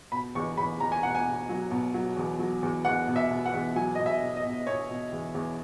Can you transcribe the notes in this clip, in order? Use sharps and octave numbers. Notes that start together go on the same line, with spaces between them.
B2 B5
E2 C#6
E2 B5
E2 A#5
G#5
B2 F#5
G#5
B2
F#3
B2
F#3
E2
F#3
E2
E2 F#5
B2
E5
B2
F#5
E2
F#3 G#5
B2 D#5
E5
B2
D#5
B2
B2 C#5
B2
E2
E2